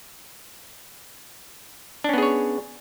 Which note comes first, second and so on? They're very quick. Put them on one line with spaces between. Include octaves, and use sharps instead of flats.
D4 C#4 B3 G#4 C#5